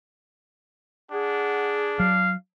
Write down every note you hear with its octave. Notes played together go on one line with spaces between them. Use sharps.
D4 G#4 F#5
F#3 F5